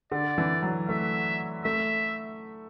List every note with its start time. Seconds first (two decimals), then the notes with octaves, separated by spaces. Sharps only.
0.12 D3 D5
0.38 E3
0.62 F#3
0.89 A3 E5
1.65 A3 E5